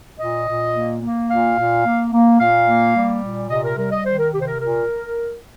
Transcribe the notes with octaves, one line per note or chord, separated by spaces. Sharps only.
A#2 D#5
A#2
A#3
A#3
A#2 F5
A#2
A#3
A#3
A#2 F5
A#3
G3
A#2
C3 D#5
A#4
G3 A#4
D#5
D#3 C5
A#4
C3 G4
C5
A#4
A#2 A#4